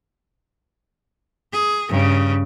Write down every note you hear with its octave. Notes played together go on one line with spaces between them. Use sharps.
G#4
G2 C#3